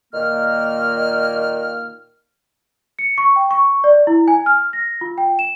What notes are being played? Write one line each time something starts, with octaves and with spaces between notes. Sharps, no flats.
A#2 D#3 A#3 F6
C#7
C#6
G5
C#6
D5
E4
G#5
F6
A#6
F4
G5
E7